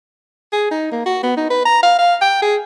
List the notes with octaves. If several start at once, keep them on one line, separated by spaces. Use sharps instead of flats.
G#4
D#4
A#3
F#4
B3
D#4
B4
A#5
F5
F5
G5
G#4